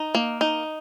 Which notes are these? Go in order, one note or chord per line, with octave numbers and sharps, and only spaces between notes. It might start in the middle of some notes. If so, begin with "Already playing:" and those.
Already playing: D#4
A#3
D#4